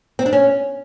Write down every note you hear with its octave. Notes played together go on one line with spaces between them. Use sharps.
C4
D4
C#4